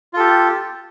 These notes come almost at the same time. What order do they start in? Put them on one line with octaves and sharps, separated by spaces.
F4 A4 G4